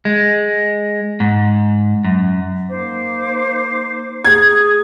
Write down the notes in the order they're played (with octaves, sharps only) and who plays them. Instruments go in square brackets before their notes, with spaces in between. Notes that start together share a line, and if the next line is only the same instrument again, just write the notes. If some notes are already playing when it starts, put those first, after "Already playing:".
[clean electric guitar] G#3
G#2
F#2
[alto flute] A#3 [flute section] D#4 C5 D6
[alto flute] G#4 [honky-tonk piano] G#6